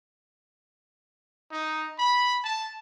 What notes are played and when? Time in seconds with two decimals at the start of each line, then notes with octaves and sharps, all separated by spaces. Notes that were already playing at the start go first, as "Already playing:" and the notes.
1.51 D#4
1.98 B5
2.43 A5